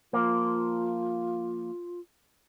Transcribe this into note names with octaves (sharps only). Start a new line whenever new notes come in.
F3 A#3 F4